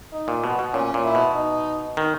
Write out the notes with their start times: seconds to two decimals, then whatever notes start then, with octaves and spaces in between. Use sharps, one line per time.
0.12 D#4
0.28 A#2
0.43 B2 B3
0.59 B2
0.73 A#2 C#4
0.94 A#2
1.04 E4
1.15 B2
1.35 D#4
1.97 D#3